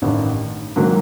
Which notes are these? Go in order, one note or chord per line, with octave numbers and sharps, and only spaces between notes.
A1 G2 D#3
G#2 D#3 F#3 A#3